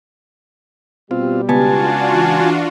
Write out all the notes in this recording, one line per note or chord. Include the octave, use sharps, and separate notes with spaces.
B2 G3 C4 F4 G4
C#2 B3 D4 F4 F#4 G#5 A5
E3